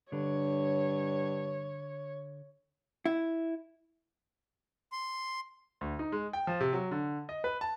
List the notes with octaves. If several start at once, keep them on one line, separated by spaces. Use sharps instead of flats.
G2 D3 C#5
E4
C6
D2
D#4
G#3
G5
F3
C3
F#3
D3
D#5
B4
A5